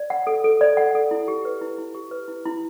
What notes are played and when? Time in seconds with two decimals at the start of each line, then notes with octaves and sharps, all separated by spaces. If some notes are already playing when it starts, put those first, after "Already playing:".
Already playing: D5
0.10 F#5
0.27 A4
0.44 A4
0.61 D5
0.77 F#5
0.95 A4
1.11 E4
1.28 G4
1.45 B4
1.61 E4
1.78 E4
1.95 G4
2.11 B4
2.28 E4
2.45 E4